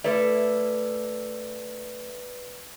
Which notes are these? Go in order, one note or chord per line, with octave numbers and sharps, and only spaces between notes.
A3 E4 B4 D5